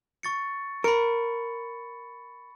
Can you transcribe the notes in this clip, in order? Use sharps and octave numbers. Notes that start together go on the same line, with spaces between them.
C#6 A6 C#7
A#4 B5 C#7